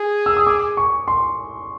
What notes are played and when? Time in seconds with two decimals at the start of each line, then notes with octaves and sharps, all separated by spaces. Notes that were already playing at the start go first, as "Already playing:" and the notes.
Already playing: G#4
0.26 E6
0.37 D#6
0.47 D6
0.77 C#6
1.08 C6